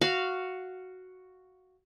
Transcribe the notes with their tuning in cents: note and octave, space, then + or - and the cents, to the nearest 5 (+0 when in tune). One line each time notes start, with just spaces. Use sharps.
F#4 +0 F5 -10